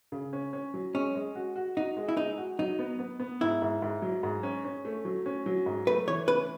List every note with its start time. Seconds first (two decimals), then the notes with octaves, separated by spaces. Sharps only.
0.12 C#3
0.33 C#4
0.53 C#4
0.74 F#3
0.94 G#3 C#4
1.15 G#3
1.35 F#4
1.56 F#4
1.77 D#4 F#4
1.97 G#3
2.08 E4
2.17 G#3 D#4
2.37 F#4
2.59 F#3 D#4
2.79 B3
2.99 B3
3.20 B3
3.41 G#2 E4
3.62 G#2
3.82 G#2
4.02 F#3
4.23 G#2
4.43 C#4
4.65 C#4
4.85 A3
5.05 F#3
5.26 C#4
5.46 F#3
5.66 G#2
5.87 A3 B4
6.08 E3 C#5
6.28 C#4 B4